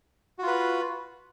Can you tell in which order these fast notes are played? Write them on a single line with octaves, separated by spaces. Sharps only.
F#4 F4 B4